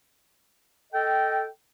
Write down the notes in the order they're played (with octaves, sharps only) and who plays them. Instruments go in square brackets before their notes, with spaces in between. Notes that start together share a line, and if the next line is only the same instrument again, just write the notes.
[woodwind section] A4 D#5 G5